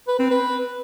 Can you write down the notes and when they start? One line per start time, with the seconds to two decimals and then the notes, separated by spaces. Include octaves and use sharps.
0.08 B4
0.19 C4
0.30 B4